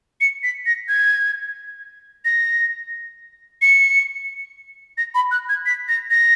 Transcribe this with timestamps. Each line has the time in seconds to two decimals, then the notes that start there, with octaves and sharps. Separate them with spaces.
0.21 C#7
0.43 B6
0.66 A#6
0.88 G#6
2.25 A#6
3.62 C#7
4.98 A#6
5.15 B5
5.31 F#6
5.49 G#6
5.66 B6
5.88 A#6
6.11 A#6